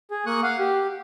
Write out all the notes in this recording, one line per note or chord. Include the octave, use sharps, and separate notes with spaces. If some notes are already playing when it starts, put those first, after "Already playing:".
G#4
A#3 C#6 D#6 F#6
F5 F#5
G4